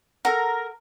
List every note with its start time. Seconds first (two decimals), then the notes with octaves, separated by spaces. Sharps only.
0.25 A4 A#4 F#5